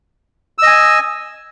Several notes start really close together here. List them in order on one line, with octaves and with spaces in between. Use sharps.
E6 D#5 G#5